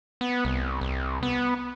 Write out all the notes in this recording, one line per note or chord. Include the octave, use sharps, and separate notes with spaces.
B3
C2
C2
B3